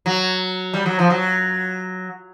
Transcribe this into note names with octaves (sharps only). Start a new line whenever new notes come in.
F#3
G3
F#3
F3
F#3